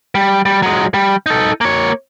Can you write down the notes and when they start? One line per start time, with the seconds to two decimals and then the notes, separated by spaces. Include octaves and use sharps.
0.15 G3
0.45 G3
0.62 F#3 G#3
0.94 G3
1.26 D#4 A4
1.61 A#3 C#5